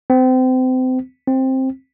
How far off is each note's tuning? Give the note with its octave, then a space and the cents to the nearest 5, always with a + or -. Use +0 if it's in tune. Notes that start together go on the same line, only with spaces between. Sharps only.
C4 -30
C4 +10